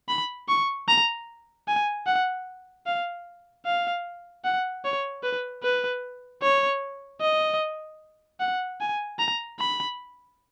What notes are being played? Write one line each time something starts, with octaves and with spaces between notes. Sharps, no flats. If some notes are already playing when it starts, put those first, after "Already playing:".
B5
C#6
A#5
G#5
F#5
F5
F5
F#5
C#5
B4
B4
C#5
D#5
F#5
G#5
A#5
B5